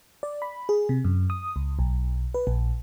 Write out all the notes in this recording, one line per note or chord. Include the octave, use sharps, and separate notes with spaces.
D5
B5
G#4
C3
F#2
D#6
C#2
B1
B4
A#1